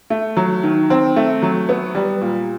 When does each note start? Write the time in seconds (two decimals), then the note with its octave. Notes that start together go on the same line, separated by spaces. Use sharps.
0.10 A3
0.37 F#3
0.63 D#3
0.90 C4
1.16 A3
1.42 F#3
1.69 B3
1.95 G3
2.21 A#2